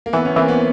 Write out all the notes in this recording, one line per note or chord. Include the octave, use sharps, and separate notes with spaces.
A#3
E3 B3
B3 C#4
E3 A#3 C4
B3